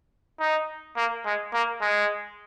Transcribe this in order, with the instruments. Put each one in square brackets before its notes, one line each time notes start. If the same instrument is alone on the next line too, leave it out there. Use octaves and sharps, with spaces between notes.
[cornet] D#4
A#3
G#3
A#3
G#3